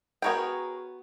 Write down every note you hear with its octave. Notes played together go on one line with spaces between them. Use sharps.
B3 F#4 G#4 A#4 C#5 G5